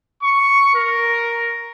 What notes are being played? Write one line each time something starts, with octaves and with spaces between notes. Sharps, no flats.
C#6
A#4